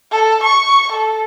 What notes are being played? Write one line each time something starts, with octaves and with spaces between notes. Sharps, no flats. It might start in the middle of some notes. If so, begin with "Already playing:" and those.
A4
C#6
A4